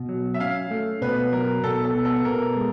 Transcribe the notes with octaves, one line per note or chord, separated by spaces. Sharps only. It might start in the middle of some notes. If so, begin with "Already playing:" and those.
Already playing: B2
F#3
E5
C#4 F5
A3
B2 B4
F#3 A#4
B2 A4
A4
B3
A4
B2 A#4
G#3